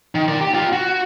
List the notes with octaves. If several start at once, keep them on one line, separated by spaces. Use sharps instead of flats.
D#3
A#4 D5
G4
F4 G4
F#4